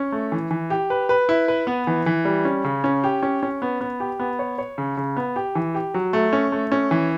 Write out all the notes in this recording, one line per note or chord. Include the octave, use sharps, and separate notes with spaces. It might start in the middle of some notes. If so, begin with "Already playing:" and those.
Already playing: C#4
A3
E3
E3
G4
B4
B4
E4
B4
B3
E3
E3
G3
C#4
C#3
C#4
G4
C#4
C#4
B3
B3
G4
B3
C#5
C#5
C#3
C#3
B3
G4
E3
G4
F#3
A3
C#4
A3
C#4
E3